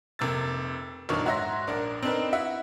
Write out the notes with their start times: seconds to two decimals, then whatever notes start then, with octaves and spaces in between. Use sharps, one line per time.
0.19 F1 C3 A#3 E6 A6
1.09 F1 A#1 D#3 F#3 D4 C#6
1.25 G#2 F#4 C#5 E5 C6 A#6
1.67 A#1 D4 A#4
2.03 C4 D4 D#4 A#4 B4
2.33 E4 F#4 E5 F#5